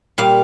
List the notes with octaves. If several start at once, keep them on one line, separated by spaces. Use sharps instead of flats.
A#2 G3 F5